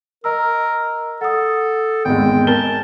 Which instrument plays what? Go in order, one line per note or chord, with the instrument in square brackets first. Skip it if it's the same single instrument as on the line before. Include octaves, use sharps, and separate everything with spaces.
[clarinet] A#4 [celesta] D#5 A#5 E6
[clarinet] A4 [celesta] F#5 D#6
[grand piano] G#1 E2 G#3 [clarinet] G5
[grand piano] A#4 G7 [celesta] G#5 [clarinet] A5